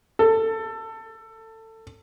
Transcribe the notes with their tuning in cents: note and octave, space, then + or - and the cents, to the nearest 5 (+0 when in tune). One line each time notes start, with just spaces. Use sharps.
A4 +20